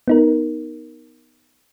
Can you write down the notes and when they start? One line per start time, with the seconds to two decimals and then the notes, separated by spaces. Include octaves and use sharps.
0.08 B3 D#4 A#4